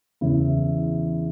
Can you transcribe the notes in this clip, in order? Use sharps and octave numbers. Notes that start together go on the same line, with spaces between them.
E2 C#3 E3 E4